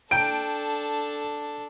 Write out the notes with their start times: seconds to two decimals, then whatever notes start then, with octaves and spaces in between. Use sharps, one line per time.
0.11 D4 A4 G5 D7